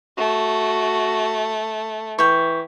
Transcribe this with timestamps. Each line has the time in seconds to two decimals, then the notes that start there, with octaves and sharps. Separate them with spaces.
0.18 A3 F#4
2.18 E3 G5 C#6